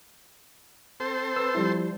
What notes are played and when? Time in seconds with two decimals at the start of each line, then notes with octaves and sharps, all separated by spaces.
1.00 C4 A4 C5
1.36 B4 E6
1.55 F3 G3 E4